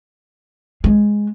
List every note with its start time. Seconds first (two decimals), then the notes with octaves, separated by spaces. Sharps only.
0.84 G#3